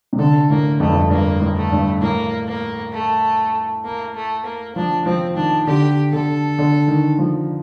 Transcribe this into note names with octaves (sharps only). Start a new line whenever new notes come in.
C3
D3 A4
A2 A#3
F2 A3
G2
F2
G2 A#3
A2
A3
G2
A2 A#3
A#3
A3
A#3
A3
A#3
F3 D4
F3 C4
D#3 D4
D3 G4
D3 A4
D3
D#3
F3